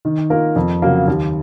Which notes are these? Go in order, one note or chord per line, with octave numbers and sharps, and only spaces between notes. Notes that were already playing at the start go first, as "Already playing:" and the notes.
D#3
A#3 F4 A#4
F2
C#3 F#3 A#3
D#2